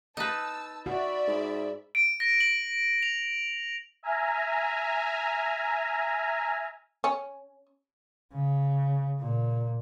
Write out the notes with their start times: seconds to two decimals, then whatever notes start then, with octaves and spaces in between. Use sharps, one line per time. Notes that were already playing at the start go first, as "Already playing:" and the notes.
0.17 D#4 B4 A5 E6
0.86 F#4 D5 E5 B5
1.28 G#2
1.95 D7
2.20 A#6
2.40 F#7
3.02 F7
4.03 E5 G#5 A#5 F6
7.04 C#4
8.33 C#3
9.20 A#2